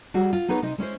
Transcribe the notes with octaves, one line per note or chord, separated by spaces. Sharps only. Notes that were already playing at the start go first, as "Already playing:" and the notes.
G3 F#4 G#4
F4
B3 D#4 G#4 B4 C#5
C3 D#4 D#5
G#3 C#4 E4 C5